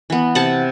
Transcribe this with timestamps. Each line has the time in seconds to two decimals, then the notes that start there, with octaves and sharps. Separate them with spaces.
0.10 E3 B3
0.35 C3 F#5 A5